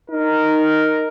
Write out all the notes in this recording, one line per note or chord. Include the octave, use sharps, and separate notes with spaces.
D#4 A#4